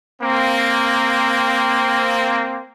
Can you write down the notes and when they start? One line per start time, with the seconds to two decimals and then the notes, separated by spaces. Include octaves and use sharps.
0.22 A#3 C4